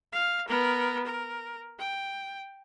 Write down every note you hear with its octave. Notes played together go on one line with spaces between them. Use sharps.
F5
B3 A#4
A#4
G5